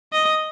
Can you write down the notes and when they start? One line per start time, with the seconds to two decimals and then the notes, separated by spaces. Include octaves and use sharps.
0.13 D#5